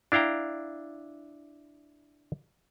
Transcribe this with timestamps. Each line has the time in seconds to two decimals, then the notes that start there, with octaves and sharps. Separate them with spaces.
0.12 D4 E4 F5 G5 A#5